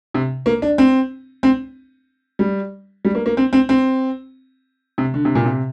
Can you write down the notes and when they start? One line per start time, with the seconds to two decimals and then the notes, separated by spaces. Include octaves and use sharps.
0.14 C3
0.46 A#3
0.62 D4
0.78 C4
1.43 C4
2.39 G3
3.05 G3
3.15 A#3
3.26 A#3
3.37 C4
3.53 C4
3.69 C4
4.98 C3
5.14 D3
5.25 C3
5.35 A#2
5.45 C3